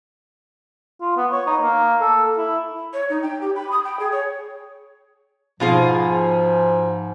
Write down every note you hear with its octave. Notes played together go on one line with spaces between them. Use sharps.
F4
B3
C#5
D#4
A#3
A4
E4
C#5
D#4
G5
G4
B5
D#6
G5
G#4
C#5
G#2 B2 F3 F4 G#4